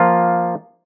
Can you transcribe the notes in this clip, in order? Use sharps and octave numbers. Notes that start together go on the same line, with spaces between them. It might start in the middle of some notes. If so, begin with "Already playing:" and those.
Already playing: F3 A#3 F4